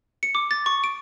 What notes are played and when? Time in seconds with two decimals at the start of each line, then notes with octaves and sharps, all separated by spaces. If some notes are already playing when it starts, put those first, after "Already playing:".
0.23 C#7
0.35 D6
0.51 A6
0.66 C#6
0.84 D7